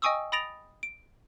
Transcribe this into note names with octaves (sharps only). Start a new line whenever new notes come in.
D#5 G5 G#5 C#6 D#6 E6
B5 D#6 A6 A#6 D7 F7
D7